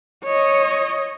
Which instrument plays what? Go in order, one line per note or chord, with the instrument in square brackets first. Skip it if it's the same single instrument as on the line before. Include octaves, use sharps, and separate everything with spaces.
[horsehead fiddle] C#5 D#5